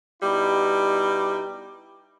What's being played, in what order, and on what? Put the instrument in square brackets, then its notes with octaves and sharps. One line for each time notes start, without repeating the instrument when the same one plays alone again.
[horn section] B2 G3 D#4 E4